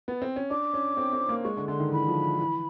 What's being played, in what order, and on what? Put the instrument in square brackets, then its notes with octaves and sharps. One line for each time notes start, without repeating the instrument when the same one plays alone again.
[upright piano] B3
C4
C#4
[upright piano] D4 [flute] D6
[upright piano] C#4
C4
C4
A#3
[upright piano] G#3 [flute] C#6
[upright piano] D3
[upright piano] D3 [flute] C6
[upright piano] D#3
[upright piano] E3 [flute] B5
[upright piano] F3
E3